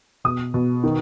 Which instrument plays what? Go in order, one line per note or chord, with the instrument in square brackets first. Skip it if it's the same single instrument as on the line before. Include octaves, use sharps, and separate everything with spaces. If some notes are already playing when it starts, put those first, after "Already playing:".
[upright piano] B2 D#6
B2
D#3